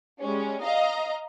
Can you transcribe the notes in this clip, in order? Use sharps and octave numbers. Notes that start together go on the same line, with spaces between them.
G3 G#3 C#4
D#5 F5 A#5